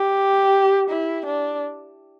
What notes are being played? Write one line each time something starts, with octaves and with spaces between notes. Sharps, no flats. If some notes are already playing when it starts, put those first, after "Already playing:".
Already playing: G4
E4
D4